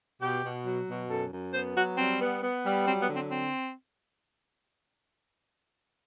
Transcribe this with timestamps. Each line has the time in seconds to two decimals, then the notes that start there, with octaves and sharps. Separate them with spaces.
0.21 B2 G4
0.43 B2
0.65 F#3
0.87 B2
1.09 F#2 A4
1.31 F#2
1.53 B3 C5
1.75 F#3 F#4
1.98 G3 C4
2.20 B3
2.42 B3
2.64 G3
2.86 F#3 C4
3.01 B3
3.08 D3
3.15 C4
3.30 C4